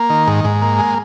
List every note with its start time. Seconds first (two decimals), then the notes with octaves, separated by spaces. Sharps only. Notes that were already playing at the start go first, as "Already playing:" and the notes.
Already playing: A#3
0.10 D#3
0.27 G#2
0.44 G#2
0.62 A#3
0.79 G#3